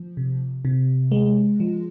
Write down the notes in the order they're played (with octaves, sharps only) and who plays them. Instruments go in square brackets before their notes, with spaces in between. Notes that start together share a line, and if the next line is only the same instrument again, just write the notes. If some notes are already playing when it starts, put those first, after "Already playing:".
Already playing: [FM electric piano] F3
C3
C3
G#3
F3